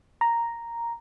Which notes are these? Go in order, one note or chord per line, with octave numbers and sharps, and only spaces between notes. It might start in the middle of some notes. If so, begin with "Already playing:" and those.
A#5